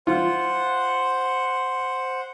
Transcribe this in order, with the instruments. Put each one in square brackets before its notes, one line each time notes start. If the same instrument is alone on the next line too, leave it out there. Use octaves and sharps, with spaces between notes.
[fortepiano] F4 [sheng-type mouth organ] C5 F#5